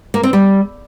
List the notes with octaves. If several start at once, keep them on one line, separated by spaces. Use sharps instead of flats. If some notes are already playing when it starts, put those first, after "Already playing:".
A#3
C4
G3